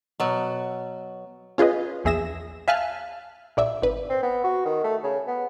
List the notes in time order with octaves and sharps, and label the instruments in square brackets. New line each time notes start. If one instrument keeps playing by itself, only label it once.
[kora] B2 F#3
[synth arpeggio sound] C#4 F4 G#4 B4 D#5
A#1 E2 G#4 E5 A#6 E7
E5 F5 G#5 A5 F6 F#6
A#1 D5 E5
G#1 B4
[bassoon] C4
B3
F#4
D#3
A3
C#3
B3